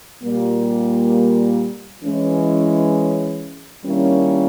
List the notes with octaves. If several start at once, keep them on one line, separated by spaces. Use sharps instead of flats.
A#2 G3 A#3
E3 G#3 C#4
D#3 G3 A#3 C#4 E4